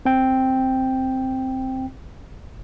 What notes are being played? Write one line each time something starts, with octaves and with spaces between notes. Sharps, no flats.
C4 G5